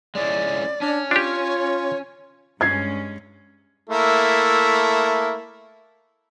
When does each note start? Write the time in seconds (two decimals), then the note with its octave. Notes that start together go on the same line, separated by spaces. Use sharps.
0.15 G#3 C#4 E4 D5
0.81 C#4 D4
1.11 D4 F4 G4 C#5
2.61 G2 G#3 C#4 G#6 C7
3.89 A3 A#3 E4